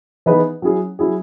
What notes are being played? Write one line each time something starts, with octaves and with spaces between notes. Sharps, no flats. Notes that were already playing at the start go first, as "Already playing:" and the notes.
E3 B3 D#4 G#4 B4
F#3 C#4 E4 G#4
F#3 C#4 E4 G#4